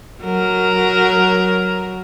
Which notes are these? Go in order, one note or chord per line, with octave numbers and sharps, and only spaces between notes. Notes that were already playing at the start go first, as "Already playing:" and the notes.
F#3 A#4